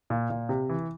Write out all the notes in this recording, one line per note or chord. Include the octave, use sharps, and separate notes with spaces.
A#2
A#2
C3
E3